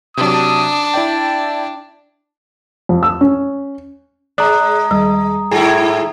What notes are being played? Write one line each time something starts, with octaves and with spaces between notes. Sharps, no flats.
C3 F#3 D4 D#6
E4 D5 G5 A5
F2
E6
C#4
G#3 D5 A#5 D#6 F#6
D#2 G3
G#2 E4 G#4 A4